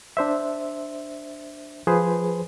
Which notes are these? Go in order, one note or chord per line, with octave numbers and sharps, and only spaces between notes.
D4 C5 E5
F3 G#4 B4 C5